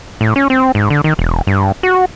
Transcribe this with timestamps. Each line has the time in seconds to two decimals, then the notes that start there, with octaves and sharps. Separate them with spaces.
0.21 A2
0.36 C#4
0.50 C4
0.75 G#2
0.90 D3
1.04 D#3
1.19 E1
1.47 G2
1.83 F#4